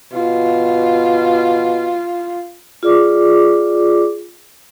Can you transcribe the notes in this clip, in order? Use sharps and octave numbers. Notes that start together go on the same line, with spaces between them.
B2 F4
F4 G#4 D5 D6